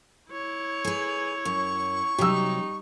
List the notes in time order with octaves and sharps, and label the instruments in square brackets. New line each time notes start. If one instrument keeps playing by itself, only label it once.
[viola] E4 C#5
[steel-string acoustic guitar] G#4 B4
[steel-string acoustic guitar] F#2 [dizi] C#6
[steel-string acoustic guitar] C3 F#3 [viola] G3 D#4 [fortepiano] G4 E6